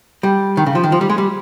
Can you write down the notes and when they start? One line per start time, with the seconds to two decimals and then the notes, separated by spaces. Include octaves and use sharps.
0.23 G3
0.57 D#3
0.66 C#3
0.75 F3
0.84 D#3
0.92 F3
1.01 G3
1.10 G#3
1.18 G3